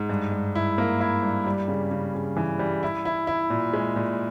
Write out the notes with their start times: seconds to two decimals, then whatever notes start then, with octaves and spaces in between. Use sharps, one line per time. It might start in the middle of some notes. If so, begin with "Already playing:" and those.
Already playing: G#2
0.09 G2
0.32 G2
0.55 E4
0.78 A#3
1.01 E4
1.23 G2
1.46 G3
1.68 C#3
1.91 C#3
2.14 C#3
2.37 E3
2.59 G3
2.83 E4
3.05 E4
3.27 E4
3.50 A#2
3.74 G#3
3.96 A#2